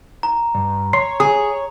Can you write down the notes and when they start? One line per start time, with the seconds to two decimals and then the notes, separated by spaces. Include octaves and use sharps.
0.23 A#5
0.54 G2
0.93 C#5 C6 C7
1.20 G#4 D#6